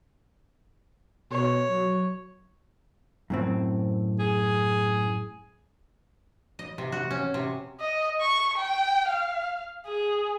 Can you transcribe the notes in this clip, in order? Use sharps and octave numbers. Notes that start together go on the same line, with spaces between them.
B2 C#5
F#3
F#2 A2 C4
G#4
D#5
C3
F#4
C#4
C3
D#5
C#6
G5
F5
G#4